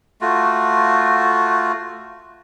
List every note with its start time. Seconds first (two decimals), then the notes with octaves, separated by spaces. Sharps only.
0.21 A3 F4 F#4